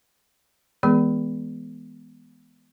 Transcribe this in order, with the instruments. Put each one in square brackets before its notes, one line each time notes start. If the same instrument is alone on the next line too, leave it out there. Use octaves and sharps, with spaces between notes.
[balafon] E3 G#3 B3 G#4